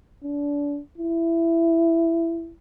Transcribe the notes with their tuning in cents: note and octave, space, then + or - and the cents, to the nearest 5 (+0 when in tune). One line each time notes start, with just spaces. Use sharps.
D4 -30
E4 +15